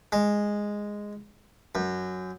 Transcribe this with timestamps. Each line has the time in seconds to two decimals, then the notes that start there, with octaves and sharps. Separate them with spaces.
0.12 G#3
1.75 F#2